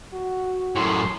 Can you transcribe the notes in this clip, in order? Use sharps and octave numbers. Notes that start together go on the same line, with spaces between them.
F#4
F#2 A2 C6